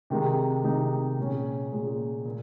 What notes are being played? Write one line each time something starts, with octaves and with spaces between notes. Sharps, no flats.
C3 D#3 G#3 D#4
C3 D#3 G#3 D#4
A#2 G#3 C#4
A#2 G#3 C#4
A#2